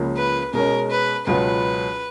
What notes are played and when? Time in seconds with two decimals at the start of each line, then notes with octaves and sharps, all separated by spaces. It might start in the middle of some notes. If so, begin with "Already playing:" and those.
Already playing: C#2 C#3 F3 A#3 C#4
0.17 B4
0.53 B2 G#3 C#4 A#4
0.91 B4
1.26 C#2 B2 F#3 B3 F4 B4